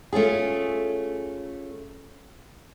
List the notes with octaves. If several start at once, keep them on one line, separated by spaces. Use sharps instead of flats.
A3 C#4 F4 G#4